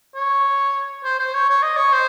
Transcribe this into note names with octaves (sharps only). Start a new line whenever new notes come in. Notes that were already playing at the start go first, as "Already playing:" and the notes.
C#5
C5
C5
C#5
C#5
D#5
C#5
C5